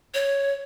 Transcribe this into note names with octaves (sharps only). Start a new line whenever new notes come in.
C#5